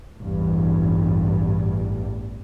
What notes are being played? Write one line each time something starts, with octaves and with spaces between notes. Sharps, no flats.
A1 E2 G2